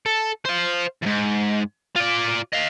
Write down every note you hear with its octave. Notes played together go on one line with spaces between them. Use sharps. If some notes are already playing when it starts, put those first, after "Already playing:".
A4
C5 F5
E2 G#2
F4 D5
D#5 F5